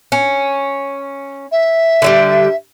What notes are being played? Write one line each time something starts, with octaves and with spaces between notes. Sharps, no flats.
C#4
E5
D3 F#3 G3